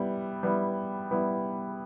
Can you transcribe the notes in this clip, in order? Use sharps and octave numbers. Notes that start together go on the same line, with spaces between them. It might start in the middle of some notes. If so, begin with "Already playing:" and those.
Already playing: G3 B3 E4
G3 B3 E4
G3 B3 E4